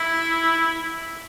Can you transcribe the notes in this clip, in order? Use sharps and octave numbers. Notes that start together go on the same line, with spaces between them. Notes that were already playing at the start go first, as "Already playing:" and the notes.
Already playing: E4